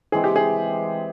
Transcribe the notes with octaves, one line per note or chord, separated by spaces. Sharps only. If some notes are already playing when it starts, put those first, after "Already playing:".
E3 G#3 C4 G#4
G4
G#4